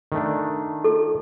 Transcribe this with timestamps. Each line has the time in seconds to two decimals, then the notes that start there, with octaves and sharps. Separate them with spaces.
0.12 D#3 A3 D4
0.84 A4